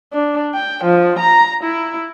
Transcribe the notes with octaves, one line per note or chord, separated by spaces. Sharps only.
D4
G5
F3
A#5
E4